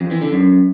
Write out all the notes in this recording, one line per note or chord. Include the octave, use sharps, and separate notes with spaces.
F2
E3
D3
F#2